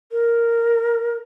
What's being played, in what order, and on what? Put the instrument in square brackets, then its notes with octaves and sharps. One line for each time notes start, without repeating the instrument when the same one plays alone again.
[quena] A#4